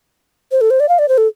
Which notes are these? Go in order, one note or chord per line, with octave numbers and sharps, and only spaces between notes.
C5
A4
C5
D5
F5
D5
C5
A4